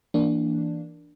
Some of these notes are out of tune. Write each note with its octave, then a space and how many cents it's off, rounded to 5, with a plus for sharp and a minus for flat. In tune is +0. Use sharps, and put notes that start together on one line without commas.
E3 +0 A#3 +0 D4 +0